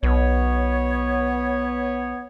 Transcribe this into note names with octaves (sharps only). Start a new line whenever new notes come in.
B1 B3 C#5